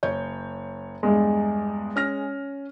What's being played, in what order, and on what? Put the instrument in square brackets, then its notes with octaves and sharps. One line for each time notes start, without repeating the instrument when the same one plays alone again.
[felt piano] F#1 C#5 G6
[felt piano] E2 G2 [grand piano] G#3
[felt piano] C#4 F6 A#6